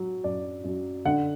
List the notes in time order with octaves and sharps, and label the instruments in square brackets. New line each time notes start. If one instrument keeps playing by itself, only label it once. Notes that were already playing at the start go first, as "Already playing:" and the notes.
Already playing: [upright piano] F#3
F#2 D5
F#2
D3 F#5